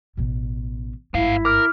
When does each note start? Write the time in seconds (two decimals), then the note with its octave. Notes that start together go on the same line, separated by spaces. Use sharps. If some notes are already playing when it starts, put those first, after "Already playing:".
0.17 A1 B2
1.14 G#1 G2 B3 E4 F5
1.45 A#4 D6 F6